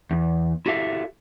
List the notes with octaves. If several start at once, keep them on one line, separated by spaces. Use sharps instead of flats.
E2
E4 F#4 G4 A4 E5 F5